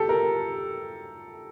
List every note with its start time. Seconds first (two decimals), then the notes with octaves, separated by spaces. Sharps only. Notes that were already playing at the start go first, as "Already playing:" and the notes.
Already playing: G4 A4
0.09 A#4